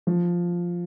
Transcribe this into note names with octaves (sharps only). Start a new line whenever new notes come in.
F3